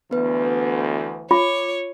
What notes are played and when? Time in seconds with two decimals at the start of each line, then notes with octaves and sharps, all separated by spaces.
0.11 D2 E3 B3 B4
1.31 F4 C#5 D6